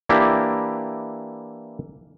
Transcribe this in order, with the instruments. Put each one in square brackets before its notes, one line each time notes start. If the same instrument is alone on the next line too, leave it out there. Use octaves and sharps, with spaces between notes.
[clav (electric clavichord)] E3 A#3 D4 E4 G4